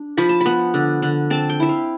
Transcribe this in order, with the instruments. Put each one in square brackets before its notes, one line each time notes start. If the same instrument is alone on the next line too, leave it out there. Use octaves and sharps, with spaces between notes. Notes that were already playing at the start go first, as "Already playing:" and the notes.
Already playing: [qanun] D4
F3 B5
A5
B5
B3
D3
D3
C4 A5
G5
E4 E5
F5